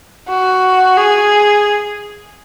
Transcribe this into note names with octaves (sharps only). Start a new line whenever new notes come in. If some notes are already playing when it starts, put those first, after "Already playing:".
F#4
G#4